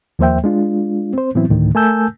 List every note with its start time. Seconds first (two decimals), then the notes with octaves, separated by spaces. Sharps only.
0.19 D#2 F3 A#3 C5 E5 G5
0.44 G#3 D4 F4
1.13 C4 C5
1.35 A2 E3 F#3 B3 C4 E4
1.49 D2 A2 D3 D#3
1.75 A3 A#4 G#5 A5 E6 G6